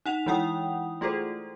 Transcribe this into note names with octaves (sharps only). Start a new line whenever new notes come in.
D#4 F#5 F7
E3 G#3 E4 F#5 G5 D#6
A3 F4 G#4 A4 C5